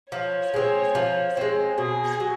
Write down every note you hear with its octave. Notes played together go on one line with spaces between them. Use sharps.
F3 C#5
G#3 C4
F3
G#3 C4
B2 G#4
F#3